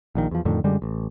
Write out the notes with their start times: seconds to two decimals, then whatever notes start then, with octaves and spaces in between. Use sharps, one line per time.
0.15 A#1 A#2 D#3
0.31 E2 F3
0.45 F2 A2 D3 D#3
0.64 F#2 D3 G3 G#3
0.82 A1